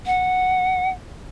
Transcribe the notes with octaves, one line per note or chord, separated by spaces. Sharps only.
F#5